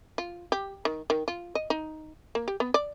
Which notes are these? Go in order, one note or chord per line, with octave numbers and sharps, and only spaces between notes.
F4
G4
D#3
D#3
F4
D#5
D#4
A#3
G4
B3
D5